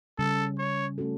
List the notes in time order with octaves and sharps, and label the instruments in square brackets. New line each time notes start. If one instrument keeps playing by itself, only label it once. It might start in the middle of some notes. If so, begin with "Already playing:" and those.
[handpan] C#3 G3 C#4 [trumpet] A4
[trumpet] C#5
[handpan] A3 C#4 F#4 A4